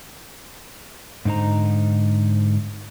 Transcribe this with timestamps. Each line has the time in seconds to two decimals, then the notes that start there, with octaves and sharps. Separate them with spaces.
1.25 G#2 D3 D#4 C5 A#5